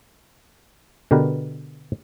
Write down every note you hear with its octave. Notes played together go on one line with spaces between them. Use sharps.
B2 D3 G4 A#4 B4